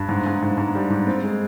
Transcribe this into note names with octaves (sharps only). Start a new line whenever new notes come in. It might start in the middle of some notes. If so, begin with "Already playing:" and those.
Already playing: G2
G#2
G#2
G#2
G#2
G3
G#2
C4
G#3